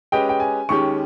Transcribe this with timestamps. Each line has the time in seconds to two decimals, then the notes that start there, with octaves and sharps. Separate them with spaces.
0.12 G#3 C#4 G4 B4 D#5 G5
0.29 G5
0.40 G#5
0.69 D#2 D#3 G#3 C#4 G4 C#6